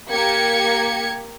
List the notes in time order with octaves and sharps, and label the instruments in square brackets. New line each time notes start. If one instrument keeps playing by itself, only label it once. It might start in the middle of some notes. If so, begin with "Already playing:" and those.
[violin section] A#3 G4 G#6 C#7